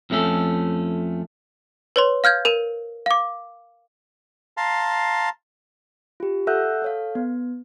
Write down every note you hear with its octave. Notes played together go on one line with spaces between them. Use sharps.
F2 F3 A3 C#4 A4
B4 C#5 C6
F5 F6 G6 G#6
A#4 D#7 E7
F5 D6
F5 A5 A#5 C6
F4 G4
A4 E5 F#5 E6 F#6 G6
A4 C#5 F5
B3